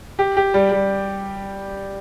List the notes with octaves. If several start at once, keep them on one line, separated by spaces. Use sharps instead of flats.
G4
G4
G3
G3